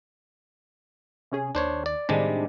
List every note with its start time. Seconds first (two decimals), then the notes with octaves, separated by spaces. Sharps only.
1.32 C3 C#4 G#4
1.55 D#2 D4 C5 C#5
1.86 D5
2.09 A2 C3 D#3 G3 G#3 D4